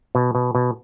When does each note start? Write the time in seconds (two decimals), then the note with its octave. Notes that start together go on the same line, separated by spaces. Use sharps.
0.15 B2
0.35 B2
0.55 B2